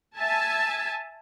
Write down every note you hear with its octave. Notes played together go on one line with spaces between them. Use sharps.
E5 G#5 A5